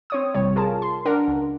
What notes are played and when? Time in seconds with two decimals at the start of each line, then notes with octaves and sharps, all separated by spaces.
0.10 C4 C#5 D#6
0.34 A1 C3 G3 C#5
0.56 F4 G#4 A#4 A5
0.82 C6
1.05 D4 A#4 F#5
1.28 C#2